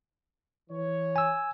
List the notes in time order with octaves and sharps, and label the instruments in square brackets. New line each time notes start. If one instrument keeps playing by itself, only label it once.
[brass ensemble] E3 C#5
[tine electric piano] G#5 E6